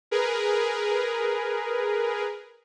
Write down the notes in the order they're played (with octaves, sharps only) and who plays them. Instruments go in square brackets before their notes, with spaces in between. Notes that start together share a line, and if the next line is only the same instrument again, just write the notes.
[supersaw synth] G#4 A#4 B4